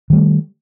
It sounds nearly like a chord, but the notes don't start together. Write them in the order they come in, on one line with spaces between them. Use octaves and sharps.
D#3 G3 A3